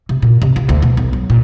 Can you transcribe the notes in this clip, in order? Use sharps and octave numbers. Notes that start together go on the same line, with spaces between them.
C3
A#2
C3
F4
D2
B2
B1
F#3
A#2